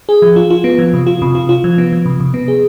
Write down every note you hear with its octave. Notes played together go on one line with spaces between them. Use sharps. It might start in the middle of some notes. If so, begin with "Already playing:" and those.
G#4
F3
F4
F4
B3
F3
C3
F4
C3
F4
F4
F3
B3
F3
C3
C3
B3
G#4